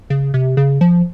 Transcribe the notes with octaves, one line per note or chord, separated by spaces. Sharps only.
C#3
C3
C#3
F3